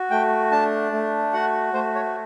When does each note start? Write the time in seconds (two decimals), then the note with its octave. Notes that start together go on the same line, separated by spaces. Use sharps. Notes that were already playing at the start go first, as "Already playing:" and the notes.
Already playing: F#4
0.11 A3 G5
0.51 D4 A5
0.92 A3
1.33 F#4 F#5
1.74 A3 C5
1.95 C#5